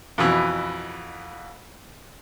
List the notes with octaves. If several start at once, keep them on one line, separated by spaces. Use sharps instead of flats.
F2 B2 E3